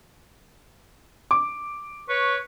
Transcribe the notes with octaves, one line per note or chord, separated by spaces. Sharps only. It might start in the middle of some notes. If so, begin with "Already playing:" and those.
D6
B4 C#5 C#6